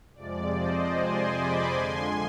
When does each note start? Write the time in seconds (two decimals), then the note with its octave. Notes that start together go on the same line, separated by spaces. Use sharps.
0.15 F2 C3 F3 G#3 D5
0.55 C5 D#5
0.95 G#5 C6
1.34 B5 D6
1.73 F2 D3 F3 G#3 G#5 C6